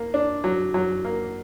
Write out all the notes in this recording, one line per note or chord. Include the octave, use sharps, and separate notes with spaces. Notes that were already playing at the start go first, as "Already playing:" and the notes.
Already playing: A#3
D4
F#3
F#3
A#3